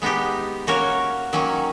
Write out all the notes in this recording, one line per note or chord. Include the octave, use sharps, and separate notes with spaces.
G#3 B3 D#4 G4
A#3 C#4 F#4 A#4 C#5
D#3 F#3 A#3 C#4